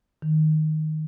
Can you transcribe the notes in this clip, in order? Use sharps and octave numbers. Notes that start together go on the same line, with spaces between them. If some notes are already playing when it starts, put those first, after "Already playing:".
D#3